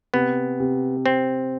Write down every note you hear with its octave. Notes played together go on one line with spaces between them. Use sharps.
C3 B3
C3
C3 C4